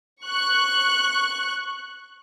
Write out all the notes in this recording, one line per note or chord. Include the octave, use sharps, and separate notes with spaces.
C#6 F#6